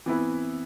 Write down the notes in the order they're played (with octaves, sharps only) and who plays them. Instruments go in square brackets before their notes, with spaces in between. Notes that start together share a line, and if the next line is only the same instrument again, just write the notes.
[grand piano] E3 B3 E4 B4 [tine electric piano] C4